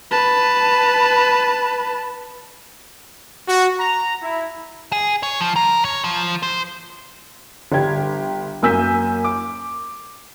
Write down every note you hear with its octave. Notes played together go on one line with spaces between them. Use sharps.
B4 A5
F#4
A#5
E4
G#4
C#5
F3
A#4
C#5
F3
C5
G1 G3 G4 G#6
F#2 A#3 G#5 E6 G6 B6
D6